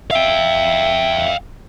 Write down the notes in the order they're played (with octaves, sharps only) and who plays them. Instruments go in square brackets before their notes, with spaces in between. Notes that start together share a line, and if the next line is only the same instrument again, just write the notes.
[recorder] E5 [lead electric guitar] F5 G5